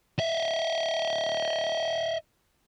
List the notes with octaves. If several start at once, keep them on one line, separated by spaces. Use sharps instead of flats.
D#5 E5